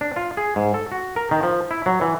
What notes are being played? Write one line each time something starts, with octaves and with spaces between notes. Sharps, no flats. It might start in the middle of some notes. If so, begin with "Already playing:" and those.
D4
F4
G#4
G#2
A4
F#4
A#4
D#3
F3
E4
F#3
E3